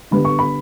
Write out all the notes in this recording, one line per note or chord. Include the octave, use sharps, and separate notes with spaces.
D3 G3 B3 B5
C#6
B5